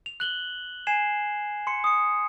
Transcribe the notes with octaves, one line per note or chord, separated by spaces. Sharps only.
F7
F#6 F#7 G7
G#5 G#6 C7 E7
C6 C#7
D#6 C#7